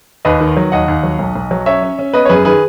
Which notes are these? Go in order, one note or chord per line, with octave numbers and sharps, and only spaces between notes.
D#2 B4 D#5
D#3
F#3
D#2 D#5 F#5
D#2
F#3
B1
B1
F#3
C#4 C#5 E5
C#4
C#4
B3 B4 D#5
C#5
F#2 G#4 B4
D#3 G#4 B4